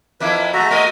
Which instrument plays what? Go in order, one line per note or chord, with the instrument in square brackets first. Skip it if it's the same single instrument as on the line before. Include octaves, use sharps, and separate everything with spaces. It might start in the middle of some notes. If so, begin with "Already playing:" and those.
[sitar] F2 A#3 E4 [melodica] B4
[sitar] G#3 A3 [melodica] F#4 E5 A#5
[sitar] A3 D#5